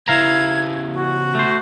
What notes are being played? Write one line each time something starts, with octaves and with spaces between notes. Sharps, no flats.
C#3 B3 E4 F5 A#5 G#6
F#4
A3 C5